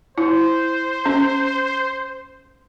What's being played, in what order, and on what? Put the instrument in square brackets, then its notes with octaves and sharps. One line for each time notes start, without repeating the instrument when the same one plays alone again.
[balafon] E4 [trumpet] C5
[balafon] C#4